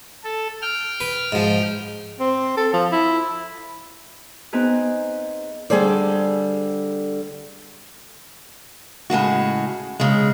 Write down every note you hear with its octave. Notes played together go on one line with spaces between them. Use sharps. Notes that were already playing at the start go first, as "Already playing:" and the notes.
A4
G5 F6
B4
G#2 F3
C4
A4
F3
E4
B3 C4 D#4 G#4 B4
D3 G3 G#4 A4 C5 D5
A2 C#3 G#3 F#4
C#3 G#3